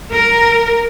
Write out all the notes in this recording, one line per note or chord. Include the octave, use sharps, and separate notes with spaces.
A#4